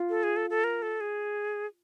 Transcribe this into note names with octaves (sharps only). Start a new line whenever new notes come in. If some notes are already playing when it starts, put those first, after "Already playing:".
Already playing: F4
A4
G#4
A4
A4
A#4
A4
G#4